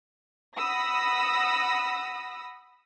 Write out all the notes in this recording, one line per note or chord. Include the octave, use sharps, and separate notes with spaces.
F#5 B5 D#6 E6 A#6